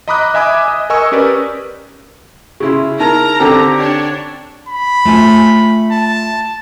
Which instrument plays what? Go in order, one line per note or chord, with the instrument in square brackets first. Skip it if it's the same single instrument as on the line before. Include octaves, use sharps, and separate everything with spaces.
[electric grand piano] D#5 A#5 B5 D6 D#6 F#6
D#5 E5 G#5 B5 D6 D#6
D#5
A#4 D#5 G#5 C#6 E6
C#4 G4 A#4 B4 D5
[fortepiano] C#3 E4 C6
[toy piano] D#4 [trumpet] A#4 [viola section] A#5
[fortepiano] D3 C4 A4 [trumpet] G4
[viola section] D4 C#5
[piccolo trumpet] B5
[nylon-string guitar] A3 F4 G#5
[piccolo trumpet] A5